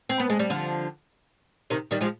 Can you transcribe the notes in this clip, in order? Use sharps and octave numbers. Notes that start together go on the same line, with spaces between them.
C4
B3
G#3
G3
D3 F3
C3 D#3
D#3 G3
F3 G#3